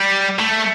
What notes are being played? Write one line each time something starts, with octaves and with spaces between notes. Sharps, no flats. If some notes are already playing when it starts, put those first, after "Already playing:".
Already playing: G3
A3